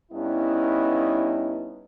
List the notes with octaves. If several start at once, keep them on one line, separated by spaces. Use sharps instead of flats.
G2 B3 C#4 D#4 E4